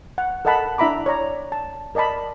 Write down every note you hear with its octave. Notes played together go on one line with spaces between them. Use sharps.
F#5
A4 A#4 D#5 F#5 A5 B5
D4 E4 E5 A#5 B5 D6
C#5 D5 A#5
A5
A#4 D5 D#5 A5 B5